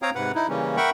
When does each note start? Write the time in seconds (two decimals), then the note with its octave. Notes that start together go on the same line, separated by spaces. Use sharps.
0.02 C4 C#5 F5 G5 A#5 D#6
0.15 G#2 C3 B4 F#5
0.35 D#4 E4
0.49 C#3 E3 G3 A#3 C#4
0.77 A#4 E5 F#5 G5 B5 C#6